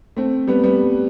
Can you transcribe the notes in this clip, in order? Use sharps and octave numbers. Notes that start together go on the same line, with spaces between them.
A3 C4
G3 B3
G3 B3